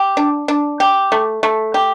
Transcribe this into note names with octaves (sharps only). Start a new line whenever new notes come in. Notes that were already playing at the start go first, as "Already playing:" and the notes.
Already playing: G4
D4
D4
G4
A3
A3
G4